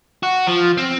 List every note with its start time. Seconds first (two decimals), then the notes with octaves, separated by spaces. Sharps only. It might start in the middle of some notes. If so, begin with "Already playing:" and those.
0.23 F#4
0.47 F3
0.78 C4